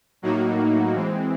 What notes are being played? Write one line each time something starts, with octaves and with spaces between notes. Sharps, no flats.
A2 F#3 A#3 D#4 F#4
E3 G#3 C4